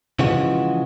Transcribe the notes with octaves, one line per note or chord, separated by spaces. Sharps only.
C#3 E3 F3 G#3 F#4